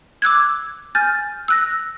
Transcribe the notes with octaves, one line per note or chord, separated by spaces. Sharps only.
D6 E6 F#6 G#6
G#5 F6 G6 A6
E6 F#6 A#6